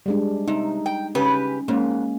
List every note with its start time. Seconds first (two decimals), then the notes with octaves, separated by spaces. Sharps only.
0.06 G3 G#3 D4
0.48 C3 D#4
0.86 G5
1.15 C#3 C#4 G4 B4
1.68 F2 G#2 G#3 A#3 C#4